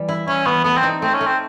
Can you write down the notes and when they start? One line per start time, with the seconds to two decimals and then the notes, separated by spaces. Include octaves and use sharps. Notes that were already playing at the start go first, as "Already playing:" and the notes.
Already playing: E3 G3
0.09 E4
0.28 C#4 E4
0.46 E3 B3
0.64 A3 B3
0.77 C4
0.83 D#4
1.02 A3 C4
1.14 C#4
1.21 A3
1.26 C4